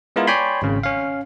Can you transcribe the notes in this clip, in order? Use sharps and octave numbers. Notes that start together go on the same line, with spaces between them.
G#3 B3 E4 F4 A#4
C#5 D5 G5 G#5 B5 C6
G#1 C#3
C#4 F5